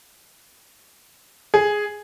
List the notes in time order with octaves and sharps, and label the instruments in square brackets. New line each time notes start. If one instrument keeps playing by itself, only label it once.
[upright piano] G#4